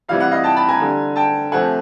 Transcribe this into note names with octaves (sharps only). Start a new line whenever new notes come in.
C3 E3 G3 F5
F#5
D#5 F5
G5 A5
A5 B5
G#5 A#5
D3 G3
G5 A5
C3 F3 A3 F#5 G#5